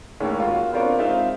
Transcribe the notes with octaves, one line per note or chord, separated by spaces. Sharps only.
D#2 A2 D#3 G#3 A#3 C#4
F4 F#4 A#4
B3 C4 D4 F4 A#4 C#5
G#3 C4 D#4 F4 E5 F5